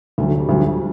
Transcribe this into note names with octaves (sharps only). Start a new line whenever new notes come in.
D2 D3 F#3 A3
A3
G3
D2 D3 F3 F#3